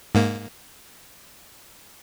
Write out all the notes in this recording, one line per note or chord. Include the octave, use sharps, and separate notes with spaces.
G#2 A#3